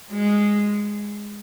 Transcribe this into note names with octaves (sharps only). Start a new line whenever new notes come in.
G#3